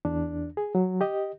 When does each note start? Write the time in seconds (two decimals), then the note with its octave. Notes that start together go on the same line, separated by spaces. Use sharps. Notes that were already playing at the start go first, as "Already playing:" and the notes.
0.05 E2 D4
0.57 G#4
0.75 F#3
1.01 G4 D#5